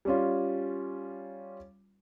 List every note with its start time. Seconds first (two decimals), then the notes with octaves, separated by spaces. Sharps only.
0.05 G3 C#4 F4